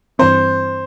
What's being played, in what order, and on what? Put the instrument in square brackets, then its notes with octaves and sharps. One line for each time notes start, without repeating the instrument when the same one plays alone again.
[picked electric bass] G2 E3 C4 [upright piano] C5